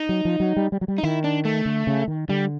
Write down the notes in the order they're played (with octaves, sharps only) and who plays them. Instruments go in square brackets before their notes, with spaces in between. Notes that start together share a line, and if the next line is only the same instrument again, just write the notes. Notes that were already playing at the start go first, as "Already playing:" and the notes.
Already playing: [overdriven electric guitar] D#4
[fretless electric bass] F#3
F3
F#3
G3
G3
F#3
G3
[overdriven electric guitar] D#4
[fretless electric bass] D#3 [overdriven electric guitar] E4
[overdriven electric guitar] D4
A3
[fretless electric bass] D3
C#3
D#3
[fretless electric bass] D3 [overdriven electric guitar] G3